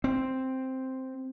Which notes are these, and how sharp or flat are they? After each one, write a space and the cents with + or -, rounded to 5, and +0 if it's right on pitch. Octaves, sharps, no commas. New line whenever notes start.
C4 +0